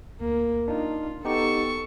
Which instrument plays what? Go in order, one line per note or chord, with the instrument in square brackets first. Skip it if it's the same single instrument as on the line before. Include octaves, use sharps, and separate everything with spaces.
[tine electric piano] D2 [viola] A#3
[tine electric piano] D4 D#4 [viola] F4
[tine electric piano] B3 D#4 G4 [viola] A4 C#6